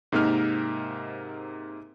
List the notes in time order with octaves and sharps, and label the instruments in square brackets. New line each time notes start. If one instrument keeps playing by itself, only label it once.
[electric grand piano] G#2 C3 A#3 D#4 A#4 F6